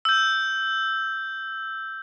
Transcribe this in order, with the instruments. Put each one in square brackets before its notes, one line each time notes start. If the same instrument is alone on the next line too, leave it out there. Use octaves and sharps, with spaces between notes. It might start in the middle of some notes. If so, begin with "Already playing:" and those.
[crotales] E6 G6